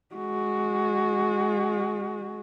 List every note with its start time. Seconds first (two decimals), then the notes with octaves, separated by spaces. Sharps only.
0.15 G#3 F#4